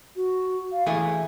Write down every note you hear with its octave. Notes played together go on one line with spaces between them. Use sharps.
F#4
F5
E3 A3 G#4 G#5